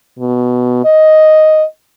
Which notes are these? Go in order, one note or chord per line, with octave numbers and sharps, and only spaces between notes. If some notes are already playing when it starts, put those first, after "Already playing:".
B2
D#5